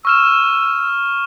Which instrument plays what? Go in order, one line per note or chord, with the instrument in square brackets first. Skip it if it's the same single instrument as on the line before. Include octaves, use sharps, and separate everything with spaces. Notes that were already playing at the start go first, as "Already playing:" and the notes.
[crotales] C#6 F6 E7 [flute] E6